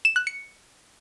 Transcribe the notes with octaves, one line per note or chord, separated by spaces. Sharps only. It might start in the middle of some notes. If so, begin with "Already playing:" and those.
E7
F#6
C#7